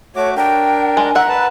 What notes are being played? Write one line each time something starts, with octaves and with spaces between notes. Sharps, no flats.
A3 F#4 C#5 D6
D4 A#4 G5
G#3
E5 F#5 A#5
B4 A5